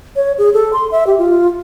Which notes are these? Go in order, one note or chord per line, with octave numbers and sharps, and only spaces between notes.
C#5
G#4
A4
C6
E5
G4
F4